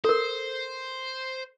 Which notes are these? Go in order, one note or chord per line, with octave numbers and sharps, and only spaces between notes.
A4 A#4 C5